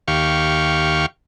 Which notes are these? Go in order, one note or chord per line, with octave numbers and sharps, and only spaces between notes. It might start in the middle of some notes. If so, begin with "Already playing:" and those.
D#2 G4 F5 C#6